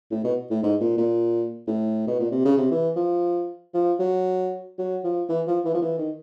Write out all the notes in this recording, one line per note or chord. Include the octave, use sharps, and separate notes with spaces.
A2
B2
A2
G#2
A#2
A#2
A2
B2
A#2
C3
C#3
C3
E3
F3
F3
F#3
F#3
F3
E3
F3
E3
F3
E3
D#3